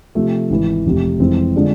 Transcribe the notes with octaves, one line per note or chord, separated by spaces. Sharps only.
C3 F3 A3
G#1 G#2 E3
F1 F2 C3
F2 E3 G#3 C4
D3 G#3 D4 F4